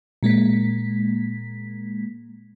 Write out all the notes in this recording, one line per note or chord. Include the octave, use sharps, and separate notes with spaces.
A#2 G#3 A#3 B6